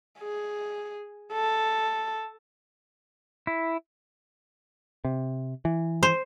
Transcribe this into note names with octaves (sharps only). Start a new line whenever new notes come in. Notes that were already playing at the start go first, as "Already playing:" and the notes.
G#4
A4
E4
C3
E3
C5